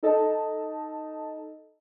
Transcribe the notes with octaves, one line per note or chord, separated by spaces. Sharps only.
D#4 A4 D#5 A5